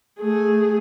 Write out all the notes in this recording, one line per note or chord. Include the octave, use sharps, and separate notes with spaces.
A3 G#4